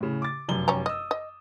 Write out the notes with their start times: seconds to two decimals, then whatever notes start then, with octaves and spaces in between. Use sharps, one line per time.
0.01 A2 C#3
0.22 D6 A6
0.48 F1 F#2 G7
0.68 G3 C#4 A#5
0.86 D#5 D#6 E6
1.11 D#5